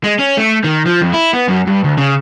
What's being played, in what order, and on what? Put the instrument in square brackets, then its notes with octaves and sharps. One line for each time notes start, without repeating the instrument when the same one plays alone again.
[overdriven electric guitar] G#3
C#4
A3
D#3
F3
F2
E4
B3
F#2
G2
D2
C#3